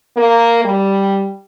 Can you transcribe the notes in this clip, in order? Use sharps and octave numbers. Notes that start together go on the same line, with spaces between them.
A#3
G3